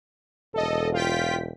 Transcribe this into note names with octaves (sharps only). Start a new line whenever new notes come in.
E1 A4 D#5
F4 G5 B6